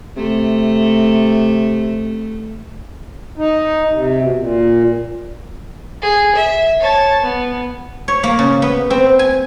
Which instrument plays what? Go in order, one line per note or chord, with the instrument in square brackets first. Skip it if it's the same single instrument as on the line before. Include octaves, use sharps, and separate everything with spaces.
[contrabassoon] C3 [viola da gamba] A3
[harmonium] D#4
C3
B2
A#2
[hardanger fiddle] G#4
E5
C#5 A5
B3
[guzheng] C#5
A#3
C#3
B3
C4
G#5